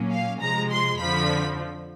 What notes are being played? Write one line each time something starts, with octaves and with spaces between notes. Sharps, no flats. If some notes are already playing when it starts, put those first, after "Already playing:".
Already playing: A#2 F#3 A#3 C#4
F5
C3 F3 G#3 A#5
C6
F2 D3 F3 B5